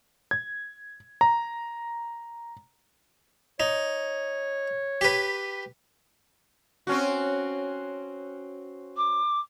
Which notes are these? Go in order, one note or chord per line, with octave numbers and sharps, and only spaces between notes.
G#6
A#5
D#4 C#5
G4 B4
C4 C#4 F#4
D6